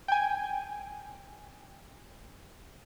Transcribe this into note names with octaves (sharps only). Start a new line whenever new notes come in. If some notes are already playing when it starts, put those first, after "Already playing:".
G5 G#5